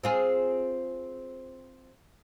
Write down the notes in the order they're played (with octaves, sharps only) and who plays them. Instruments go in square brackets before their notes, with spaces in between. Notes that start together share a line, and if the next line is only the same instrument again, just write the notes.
[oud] C4 F4 G#4